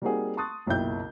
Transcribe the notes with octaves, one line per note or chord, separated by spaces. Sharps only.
G3 A#3 C4 D#4 F#4 G#4
A5 C6 C#6 D#6 F#6 A6
F#1 B1 A#2 E4 G5 G6